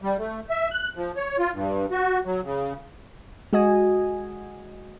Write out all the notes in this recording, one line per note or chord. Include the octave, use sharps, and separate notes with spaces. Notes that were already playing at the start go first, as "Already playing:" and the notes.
G3
A3
E5
F#6
F3
C#5
F4
G2
F#4
F#3
C#3
G#3 F#4 D#5 G#5